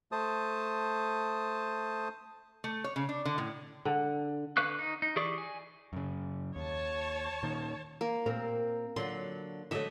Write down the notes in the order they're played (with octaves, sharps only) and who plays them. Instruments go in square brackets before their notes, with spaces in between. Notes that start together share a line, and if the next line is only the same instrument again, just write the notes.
[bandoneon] A3 C5 A5 D#6
[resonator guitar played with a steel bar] A3
C#5
C#3
D4
D3
A2
[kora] D3
[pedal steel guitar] D3 B4 F5 C#6 F#6
D#4
D#4
E3 G4 G#4 D5 C#6
G#5
[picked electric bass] F#2 C#3
[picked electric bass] D#2 [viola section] C#5 A5
[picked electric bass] A#2 D#3
[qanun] A#3
[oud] A#2 C4 A#4
[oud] D3 F#3 F4 [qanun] C6
[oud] D3 F#3 A3 [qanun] D#5 E5